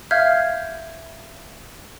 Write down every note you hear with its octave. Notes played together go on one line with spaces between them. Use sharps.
E5 F5 F6 G6 G#6